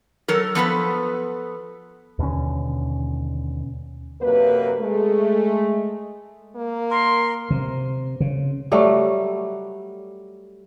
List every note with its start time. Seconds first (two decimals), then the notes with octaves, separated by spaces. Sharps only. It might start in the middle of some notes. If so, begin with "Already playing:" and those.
0.28 F#3 A4 A#4
0.55 F3 B3 A4 B4
2.19 D#2 B2 D3 C#4
4.21 F#2 C3 A#3 B4
4.80 G#3 A3
6.55 A#3
6.91 A#4 C6
7.51 C3
8.20 C#3
8.72 F#3 G3 A3